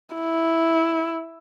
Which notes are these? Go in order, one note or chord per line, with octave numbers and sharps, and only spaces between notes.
E4